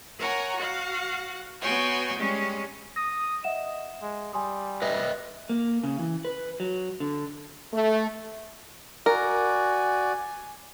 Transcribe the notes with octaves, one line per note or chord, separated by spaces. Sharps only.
A#4 C#5 F#5 G#5 A#5
F#4 F5 F#5
B3 F#4 C#5 G5 G#5 C6
G3 G#3 C#4
D#6 A#6
D#5 E5 F#5 E7
G#3
G3 G#5 C6 D#6
B4 D#5 E5
A#3
C#3
E3
B4
F#3
D3
A3
F#4 A#4 D5 G#5